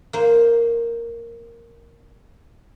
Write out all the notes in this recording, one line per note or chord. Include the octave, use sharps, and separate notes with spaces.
A#3 C5